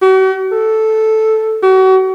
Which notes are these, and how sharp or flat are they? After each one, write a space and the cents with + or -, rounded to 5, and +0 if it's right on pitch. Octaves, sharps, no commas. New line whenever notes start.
F#4 +45
A4 -5
F#4 +35